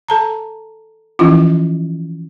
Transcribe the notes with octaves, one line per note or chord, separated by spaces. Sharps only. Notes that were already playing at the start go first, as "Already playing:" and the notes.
A4 A5 A#5
E3 F3 C#4 E4 F4